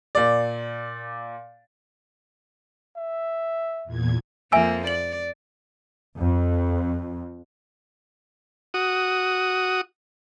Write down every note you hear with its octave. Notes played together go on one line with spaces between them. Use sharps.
A#2 D5
E5
E2 A#2 G#6
F2 F3 A#3 E5 G#5 E6
D5 F#7
F2
F#4 D#6